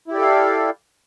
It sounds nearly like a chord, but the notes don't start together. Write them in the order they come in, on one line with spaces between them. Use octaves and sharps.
E4 G4 D5 A4 F5